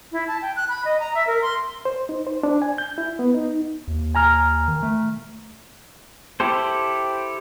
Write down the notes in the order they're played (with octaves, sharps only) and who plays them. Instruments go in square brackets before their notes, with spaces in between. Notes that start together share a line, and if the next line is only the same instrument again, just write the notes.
[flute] E4
A5
G5
F#6
B5
D#5
A#5
E5
A#4
C6
[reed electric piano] C5
D#4
C5
D4
G#5
G6
E4
B3
D#4
[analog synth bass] D#2
[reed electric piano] G#5 A#5 F6
[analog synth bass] D#3
A3
[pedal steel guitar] E4 G4 A4 C5